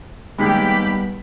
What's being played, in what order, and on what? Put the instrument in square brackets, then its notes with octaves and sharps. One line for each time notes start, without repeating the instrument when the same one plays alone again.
[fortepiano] D#2 G#3 [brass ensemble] G3 B3 [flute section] G4 [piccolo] B5